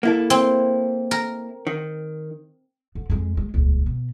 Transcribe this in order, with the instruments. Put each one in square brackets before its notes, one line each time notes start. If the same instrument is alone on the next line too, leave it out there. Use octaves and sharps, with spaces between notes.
[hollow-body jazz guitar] A#3 E4 A4
[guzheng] C4
A#4
[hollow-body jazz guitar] D#3
[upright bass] D3
F2 G#3
G#3
D#1 C#2
B2